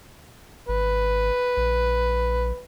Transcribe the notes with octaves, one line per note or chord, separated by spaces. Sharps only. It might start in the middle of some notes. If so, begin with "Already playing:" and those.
G#1 B4
A#1